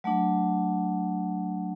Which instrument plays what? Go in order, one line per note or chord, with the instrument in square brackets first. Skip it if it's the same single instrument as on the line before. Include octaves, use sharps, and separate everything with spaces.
[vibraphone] F#3 A3 D4